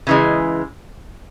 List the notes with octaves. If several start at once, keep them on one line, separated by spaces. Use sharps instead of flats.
C#3 E3 G#3